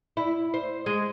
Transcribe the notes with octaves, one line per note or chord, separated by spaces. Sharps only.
E4
C5
G#3